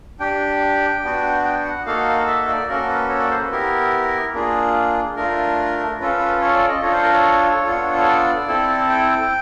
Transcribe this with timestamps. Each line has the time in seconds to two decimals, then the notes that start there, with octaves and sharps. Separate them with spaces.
0.20 D4 G4 G5
1.04 B3 D4 F#4
1.45 G5
1.64 F#5
1.86 A#3 D#4 F#4 A4 F5
2.27 E5
2.48 D5
2.68 A#3 C#4 F#4 A4 A#4
2.89 B4
3.09 C#5
3.20 D5
3.31 C5
3.41 B4
3.51 B3 E4 G4 A#4
4.34 A#3 D4 F4 G#4
5.16 A3 D4 F4 A#4
6.00 C#4 F4 A4 B4
6.20 B4
6.41 C#5
6.54 D5
6.69 D#5
6.82 D4 F4 A4 C#5
6.92 C5
7.02 A#4
7.13 C#5
7.64 B3 D4 F4 A4
7.98 C#5
8.06 D5
8.48 C4 E4 A4
8.90 G5